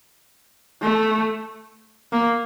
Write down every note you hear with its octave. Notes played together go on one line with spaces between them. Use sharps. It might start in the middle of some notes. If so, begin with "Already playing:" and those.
A3
A#3